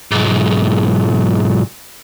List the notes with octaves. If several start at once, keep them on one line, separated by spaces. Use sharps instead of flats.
B1 G#2